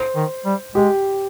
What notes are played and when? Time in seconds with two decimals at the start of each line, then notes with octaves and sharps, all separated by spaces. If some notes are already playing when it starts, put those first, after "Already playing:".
Already playing: C5
0.16 D#3
0.46 G3
0.75 G#3 G4